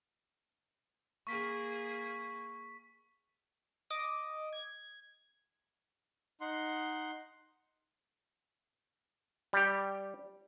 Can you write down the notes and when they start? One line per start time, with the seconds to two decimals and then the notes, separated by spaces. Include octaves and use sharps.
1.27 A#3 G#4 C#6 B6
3.90 D#5 D6 D#6
4.53 G#6
6.41 D#4 F#5 C6
9.53 G3 G4